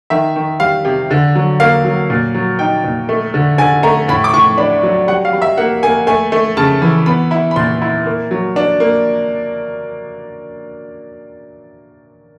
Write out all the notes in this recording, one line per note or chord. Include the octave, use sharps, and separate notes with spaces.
D#3 E5
D#3
G3 F5
C3
D3
F#3
A#3 F5
F#3
A#2
F#3
D#4 G5
A#2
A3
D3
D3 G#5
A3 A#5
A2 B5
D6
A2 C#6
D4 B5
F#3
G3 F#5
F5
G3
E5
A#3 F#5
A#3 G#5
A3 G#5
A3
C#3 A5
E3
B3 B5
E4
B5
A#2 C6
E4
A#3
F#3
D4
A#3